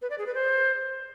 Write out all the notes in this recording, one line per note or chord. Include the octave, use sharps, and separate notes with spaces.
B4
D5
G#4
B4
C5